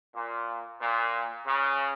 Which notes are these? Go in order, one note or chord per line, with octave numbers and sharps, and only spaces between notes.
A#2
A#2
C#3